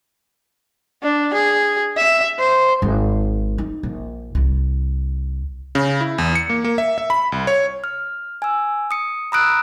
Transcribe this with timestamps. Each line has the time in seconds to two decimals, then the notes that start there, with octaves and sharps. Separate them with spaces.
1.02 D4
1.34 G#4
1.96 E5
2.39 C5
2.82 G#1
3.58 D#4
3.83 A#1
4.35 C2
5.75 C#3
6.01 E4
6.18 E2
6.35 C#7
6.50 A#3
6.64 A#3
6.78 E5
6.98 E5
7.10 B5
7.32 C2
7.47 C#5
7.84 F6
8.42 G#5 E6
8.91 D#6 C#7
9.32 A#5 B5 D#6 E6 F#6 D7